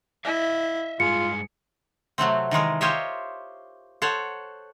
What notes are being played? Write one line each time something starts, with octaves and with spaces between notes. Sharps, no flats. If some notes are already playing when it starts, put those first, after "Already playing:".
E4 D#5 E5
G2 G#3 F4 G#4 C#7
C3 F#3 A3 C4
D#3 E3 G#3 A#4
F4 G4 C5 C#5 D#5 E5
A4 C5 C#5 F#5